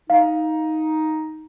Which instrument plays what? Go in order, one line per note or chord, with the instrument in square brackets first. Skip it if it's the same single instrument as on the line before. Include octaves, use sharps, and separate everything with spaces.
[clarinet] D#4 [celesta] F5